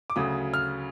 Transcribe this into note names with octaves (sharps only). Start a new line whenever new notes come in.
D6
D2 C#3 F#3 D#6
F6